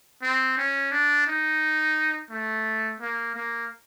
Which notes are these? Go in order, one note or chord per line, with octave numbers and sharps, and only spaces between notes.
C4
C#4
D4
D#4
A3
A#3
A#3